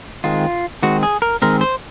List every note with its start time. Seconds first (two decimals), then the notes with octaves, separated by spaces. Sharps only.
0.24 D#3 G#3 C4 F4
0.83 D#3 G#3 C4 F#4
1.03 G#4
1.22 A#4
1.42 D#3 G#3 C4 A#4
1.61 C5